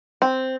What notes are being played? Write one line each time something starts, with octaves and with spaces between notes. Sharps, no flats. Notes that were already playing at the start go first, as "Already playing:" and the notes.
C4